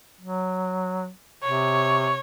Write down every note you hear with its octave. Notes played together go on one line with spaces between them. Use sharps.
F#3
C3 C#5